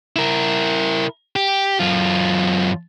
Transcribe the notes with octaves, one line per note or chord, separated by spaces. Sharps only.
E4 A#4
G4
F#2 F4